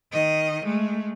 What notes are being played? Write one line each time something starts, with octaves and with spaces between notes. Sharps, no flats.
D#3 D#5
G#3 A3